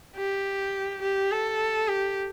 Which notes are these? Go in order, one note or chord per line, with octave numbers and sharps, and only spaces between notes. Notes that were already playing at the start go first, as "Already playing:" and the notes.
G4
G4
A4
G4